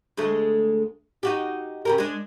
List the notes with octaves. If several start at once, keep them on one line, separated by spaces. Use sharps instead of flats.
D2 G#3 A3
D#4 F#4 G4
C#3 G4 A#4
G#3 D4